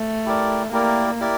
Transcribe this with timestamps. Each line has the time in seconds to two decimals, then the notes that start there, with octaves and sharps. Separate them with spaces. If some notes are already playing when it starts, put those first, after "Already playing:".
Already playing: A3
0.26 E4 G4 A#4 D5
0.72 A#3 E4 G4 A#4 D5
1.20 E4 G4 A#4 D5